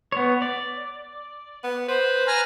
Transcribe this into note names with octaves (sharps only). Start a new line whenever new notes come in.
B3 C#5
D5
B3
B4 C5
G#5 A#5 F6